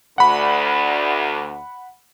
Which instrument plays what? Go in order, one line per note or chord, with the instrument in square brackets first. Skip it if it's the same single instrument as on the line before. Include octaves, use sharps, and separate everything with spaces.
[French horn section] D2 [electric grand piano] F#5 B5